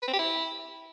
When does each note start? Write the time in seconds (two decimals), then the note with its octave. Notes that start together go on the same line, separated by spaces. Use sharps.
0.02 B4
0.08 C4
0.13 G4
0.19 E4